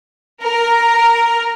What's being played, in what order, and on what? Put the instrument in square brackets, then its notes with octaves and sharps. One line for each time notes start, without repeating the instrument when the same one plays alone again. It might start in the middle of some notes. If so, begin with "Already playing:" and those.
[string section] A#4